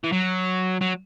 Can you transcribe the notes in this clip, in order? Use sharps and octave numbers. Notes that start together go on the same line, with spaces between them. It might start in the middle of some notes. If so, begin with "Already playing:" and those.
E3
F#3
F#3